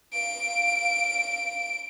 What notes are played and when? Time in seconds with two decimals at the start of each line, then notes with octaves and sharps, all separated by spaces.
0.13 F5 D7